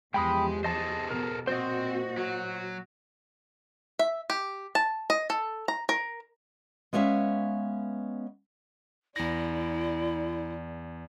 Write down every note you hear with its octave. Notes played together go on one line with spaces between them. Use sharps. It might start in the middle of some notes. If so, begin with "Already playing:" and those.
E2 F3 G#3 G4 G5 B5 D#6
G#4 A4 C5 D#5 A5
B2 A#4
A#2 C4 F#4 C5 D#5
F#3
E5
G4
A5
D#5
A4
A#5
A#4
G#3 B3 C#4 E5 F5
E2 E4 D5 A#6